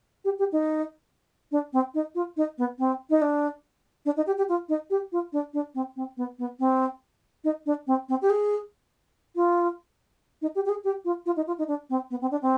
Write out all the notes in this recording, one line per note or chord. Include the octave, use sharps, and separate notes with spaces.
G4
G4
D#4
D4
C4
D#4
F4
D#4
B3
C4
D#4
D4
D4
D#4
G4
G4
F4
D#4
G4
F4
D4
D4
C4
C4
B3
B3
C4
D#4
D4
C4
C4
G4
G#4
F4
D#4
G4
G4
G#4
G4
F4
F4
D#4
F4
D#4
D4
C4
B3
C4
D4
C4